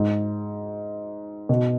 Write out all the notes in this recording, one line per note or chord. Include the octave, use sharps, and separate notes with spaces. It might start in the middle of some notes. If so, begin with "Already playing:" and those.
Already playing: G#2
B2